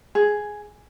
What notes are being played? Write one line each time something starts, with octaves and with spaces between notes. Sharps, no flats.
G#4